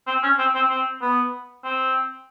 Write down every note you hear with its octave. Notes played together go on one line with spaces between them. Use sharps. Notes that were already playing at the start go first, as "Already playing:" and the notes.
C4
C#4
C4
C4
C4
B3
C4